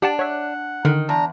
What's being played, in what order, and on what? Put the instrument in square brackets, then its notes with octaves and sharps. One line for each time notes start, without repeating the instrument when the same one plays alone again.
[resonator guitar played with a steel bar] D4 [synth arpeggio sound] G4 F#5 A5
[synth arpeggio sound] C#5 E5 [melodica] F#5
[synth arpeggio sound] D3 [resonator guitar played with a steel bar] D#3
[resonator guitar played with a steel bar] E2 [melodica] D4 A#5